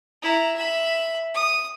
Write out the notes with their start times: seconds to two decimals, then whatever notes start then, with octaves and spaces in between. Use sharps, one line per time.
0.22 E4 A#5
0.56 E5 B5
1.34 D#6